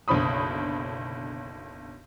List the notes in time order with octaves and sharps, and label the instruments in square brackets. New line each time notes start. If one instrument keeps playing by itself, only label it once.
[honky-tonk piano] F#1 B1 D3 C5 B5 D#6